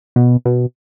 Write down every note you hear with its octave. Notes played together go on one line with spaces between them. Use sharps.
B2
B2